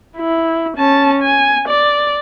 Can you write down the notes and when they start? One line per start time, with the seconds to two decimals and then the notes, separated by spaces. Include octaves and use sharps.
0.17 E4
0.77 C#4 A5
1.22 G#5
1.68 D5